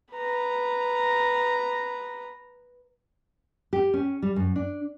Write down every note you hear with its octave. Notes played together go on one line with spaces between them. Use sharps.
B4 A#5
G4
C#4
G3
F#2
D4